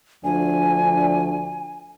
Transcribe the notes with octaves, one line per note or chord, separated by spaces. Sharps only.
D2 F3 D4 G#5